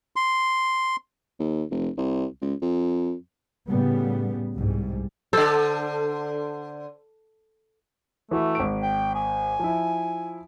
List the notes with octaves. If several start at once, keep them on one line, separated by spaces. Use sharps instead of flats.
C6
D#2
F1
C2
C#2
F2
A2 C#3 G3 B3
C2 G#2 G3
D3 A4 C5
E3 A3 E4 F#4
G#1 D7
G5
G#5
F3 E4